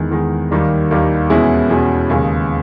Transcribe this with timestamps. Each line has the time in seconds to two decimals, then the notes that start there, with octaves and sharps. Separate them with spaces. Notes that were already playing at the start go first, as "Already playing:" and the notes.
Already playing: E2 D#3 G#3
0.11 E2 D#3 G#3
0.51 D#2 D#3 G3 A#3
0.91 D#2 D#3 G3 A#3
1.30 E2 B2 G#3 C#4 E4
1.69 E2 B2 G#3 C#4 E4
2.10 D#2 C#3 G#3